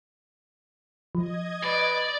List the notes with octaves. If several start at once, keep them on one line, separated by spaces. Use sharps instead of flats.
F3 D#5 G#6
B4 D5